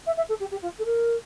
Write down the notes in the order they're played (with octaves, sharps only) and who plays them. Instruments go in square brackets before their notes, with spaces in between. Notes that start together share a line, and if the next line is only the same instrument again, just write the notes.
[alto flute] E5
E5
A4
G4
G4
F4
A4
A#4